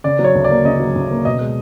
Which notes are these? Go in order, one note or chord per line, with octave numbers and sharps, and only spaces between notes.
C#3 D5
F#3
C#5
D2
D5
A#3
C#3 D#5
F#3
D2
A#3
B2 D#5
G#3